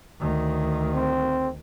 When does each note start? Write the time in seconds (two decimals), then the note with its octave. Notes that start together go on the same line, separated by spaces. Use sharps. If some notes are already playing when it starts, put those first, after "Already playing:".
0.20 D2 D#3
0.94 C4